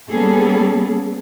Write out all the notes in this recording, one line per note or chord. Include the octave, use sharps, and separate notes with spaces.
G3 A#3 B3 C#4 G#4 A4